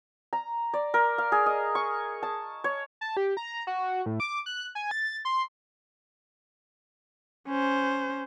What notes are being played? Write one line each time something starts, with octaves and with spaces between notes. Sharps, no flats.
A#5
D5
A#4
F5
G#4
D#5
C#6
A5
C#5
A5
G4
A#5
F#4
A2
D6
F#6
G#5
A6
C6
C#4 C5